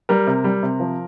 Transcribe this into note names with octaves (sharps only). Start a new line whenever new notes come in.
G3 A#4
C3
G3
C3
F3